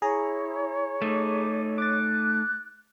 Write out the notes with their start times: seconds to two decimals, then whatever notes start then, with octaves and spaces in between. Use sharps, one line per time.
0.02 E4 G#4 C#5 A#5
1.02 A3 D#4 D6
1.78 D6 F#6 A6